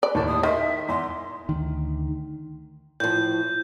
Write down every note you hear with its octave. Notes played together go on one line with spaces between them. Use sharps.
B4 D5
D#2 A2 D#3 A5
D#6
D#3 E5 C6
E2 C6
D2 D#3
A2 F3 G6